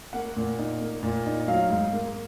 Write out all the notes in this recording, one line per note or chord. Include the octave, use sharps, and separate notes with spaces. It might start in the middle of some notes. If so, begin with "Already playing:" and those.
A#3 F#5
A#2
D#4
A#3
A#2
D#4
F#3 F5
G#2
A#3